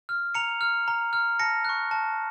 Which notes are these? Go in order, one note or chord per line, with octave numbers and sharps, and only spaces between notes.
F6
A#5 C#7 F7
F6
A#5
F6
A5 A#6 C#7
C#6 F#6
A5